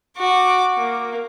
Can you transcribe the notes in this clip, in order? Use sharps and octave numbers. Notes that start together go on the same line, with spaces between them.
F#4 D6
A#3